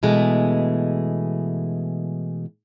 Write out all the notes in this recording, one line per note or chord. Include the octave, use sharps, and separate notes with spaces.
B2 E3 G#3 A3